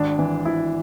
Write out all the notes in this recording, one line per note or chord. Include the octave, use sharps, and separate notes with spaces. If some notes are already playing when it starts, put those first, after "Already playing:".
Already playing: G#1 D4
E3
G#1 E4